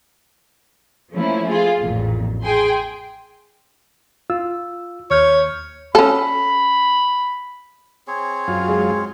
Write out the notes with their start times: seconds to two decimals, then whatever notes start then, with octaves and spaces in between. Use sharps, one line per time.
1.14 F3 A3 A#3 C#4 E4
1.50 F4 G#4
1.80 A1 F2 A#2
2.45 G#4 G5 G#5 C6
4.30 F4 E6
5.11 D#2 C#5 F6 G6
5.95 C#4 A4 B5
8.08 C4 G#4 C#5
8.48 F#2 F4
8.68 G#3